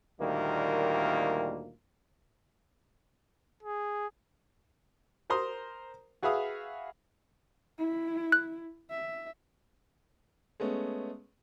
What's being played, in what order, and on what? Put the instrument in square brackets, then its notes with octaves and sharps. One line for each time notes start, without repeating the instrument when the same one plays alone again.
[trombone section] D2 A#2 D#3 G3 A#3
[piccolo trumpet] G#4
[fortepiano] A#4 C5 A#5 C6 D#6
F#4 G#4 B4 E5 F5 D#6
[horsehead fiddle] E4
[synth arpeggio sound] F#6
[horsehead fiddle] E5
[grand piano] G#3 A3 B3 C#4